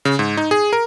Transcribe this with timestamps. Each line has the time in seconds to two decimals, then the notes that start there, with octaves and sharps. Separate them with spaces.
0.05 C#3
0.19 G#2
0.37 D#4
0.51 G#4
0.73 A#4